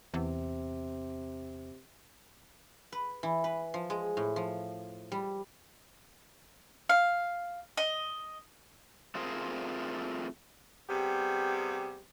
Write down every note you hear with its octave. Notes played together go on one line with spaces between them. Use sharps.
E2 C3
B4
E3
B4
F3
G#3
A2
F3
G3
F5
D#5
A3 C4 F4 G#4 A#4 C5
C3 G3 B3 G4 G#4